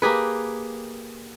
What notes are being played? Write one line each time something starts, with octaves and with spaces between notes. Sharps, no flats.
A#3 G4 G#4 B4